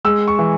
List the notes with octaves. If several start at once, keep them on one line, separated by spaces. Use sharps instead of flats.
G#3 E6
C#6
E3